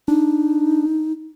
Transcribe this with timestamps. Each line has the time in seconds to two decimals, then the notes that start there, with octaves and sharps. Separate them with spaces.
0.08 D4 D#4